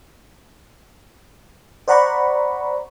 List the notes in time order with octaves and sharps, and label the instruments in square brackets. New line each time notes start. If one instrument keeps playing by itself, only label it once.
[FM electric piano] C5 D5 F#5 A#5 B5 C#6